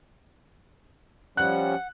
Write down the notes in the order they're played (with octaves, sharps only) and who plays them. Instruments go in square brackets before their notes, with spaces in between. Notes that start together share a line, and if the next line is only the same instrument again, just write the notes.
[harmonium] F3 G3 C#4 [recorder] F#5 [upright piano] F#6